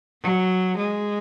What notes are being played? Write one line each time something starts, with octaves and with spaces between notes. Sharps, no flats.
F#3
G#3